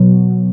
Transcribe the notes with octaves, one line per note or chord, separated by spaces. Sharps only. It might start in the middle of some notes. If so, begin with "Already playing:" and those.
Already playing: B2 F#3